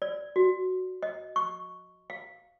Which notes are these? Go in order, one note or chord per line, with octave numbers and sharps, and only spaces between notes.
D5
F#4
D#5
C#6
F5